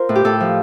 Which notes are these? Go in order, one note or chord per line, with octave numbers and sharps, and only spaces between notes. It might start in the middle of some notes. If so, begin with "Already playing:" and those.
Already playing: F4 A#4 C5
A2
G4
A2 A4
F3